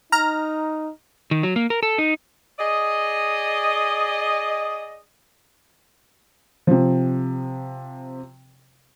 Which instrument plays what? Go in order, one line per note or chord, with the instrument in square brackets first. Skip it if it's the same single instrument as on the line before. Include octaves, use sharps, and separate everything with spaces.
[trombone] D#4 [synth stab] A#5 F6
[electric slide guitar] D#3
F#3
A#3
A#4
A4
D#4
[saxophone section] G#4 D5 D#5
[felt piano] C3 F3